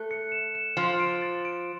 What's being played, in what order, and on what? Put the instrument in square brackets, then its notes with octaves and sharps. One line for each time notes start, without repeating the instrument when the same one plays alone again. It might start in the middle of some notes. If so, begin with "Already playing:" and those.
Already playing: [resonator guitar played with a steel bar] A3 [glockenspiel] F#6
[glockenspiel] C#7
E7
E7
[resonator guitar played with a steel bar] F3 [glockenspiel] C6
[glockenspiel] D7
A6
D7